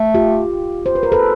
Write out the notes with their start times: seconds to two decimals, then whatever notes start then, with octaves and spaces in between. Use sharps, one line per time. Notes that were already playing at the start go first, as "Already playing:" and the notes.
Already playing: A3
0.14 F4 G4
0.86 C5
0.95 B4
1.03 A#4
1.12 A4 B4